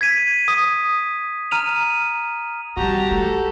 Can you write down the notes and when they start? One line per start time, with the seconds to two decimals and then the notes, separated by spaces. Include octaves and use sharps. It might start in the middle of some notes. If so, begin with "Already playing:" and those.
0.01 G#6 B6 D#7
0.48 D#6
1.51 A#5 F6 D#7 F7
2.77 G3 C4 F#4 G4 A5 A#5
3.11 A3 A4